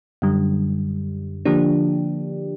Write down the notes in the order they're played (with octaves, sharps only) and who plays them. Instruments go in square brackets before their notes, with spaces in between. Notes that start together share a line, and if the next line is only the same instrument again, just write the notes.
[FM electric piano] F#2 D3 G3
D3 F3 A#3 D4 G4